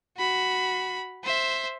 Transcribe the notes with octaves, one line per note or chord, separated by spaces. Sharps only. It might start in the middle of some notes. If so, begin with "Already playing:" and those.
F#4 B5
C5 E5